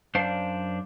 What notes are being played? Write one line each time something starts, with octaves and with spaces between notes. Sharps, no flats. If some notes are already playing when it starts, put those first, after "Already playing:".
F#2 D4 C5 D5 F5